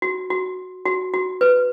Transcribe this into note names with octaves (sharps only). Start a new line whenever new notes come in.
F#4
F#4
F#4
F#4
B4